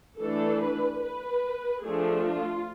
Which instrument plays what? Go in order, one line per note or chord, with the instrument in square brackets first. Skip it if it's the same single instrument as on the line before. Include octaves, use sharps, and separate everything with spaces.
[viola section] E3 A3 D4 A4
B4
B4
F3 A3 D4 G#4
F4